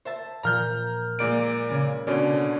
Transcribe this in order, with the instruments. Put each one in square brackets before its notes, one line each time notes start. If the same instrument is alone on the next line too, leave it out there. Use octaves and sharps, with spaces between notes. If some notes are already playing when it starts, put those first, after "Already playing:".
[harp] C5 E5 A5
[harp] A#2 F3 [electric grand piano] A#5 F6 G6
[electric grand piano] A#2 D5 D7 [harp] G#3 A#3
[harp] C#3 G#6
[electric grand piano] B2 D3 C#4 [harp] D5